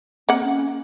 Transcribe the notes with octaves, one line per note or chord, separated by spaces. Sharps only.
A#3 C4 F#5
C#4